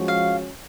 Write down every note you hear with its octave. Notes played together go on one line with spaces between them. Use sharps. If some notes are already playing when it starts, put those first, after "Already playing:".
Already playing: F3 G#3 C#4 F#4
F5